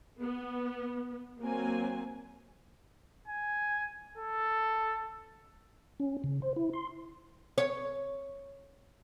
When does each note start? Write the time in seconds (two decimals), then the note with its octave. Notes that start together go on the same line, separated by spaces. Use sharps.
0.22 B3
1.40 F#3 A#3 C4 G#5
3.28 G#5
4.18 A4
6.00 C#4
6.24 C#3
6.42 C5
6.56 E4
6.73 C6
7.58 C#5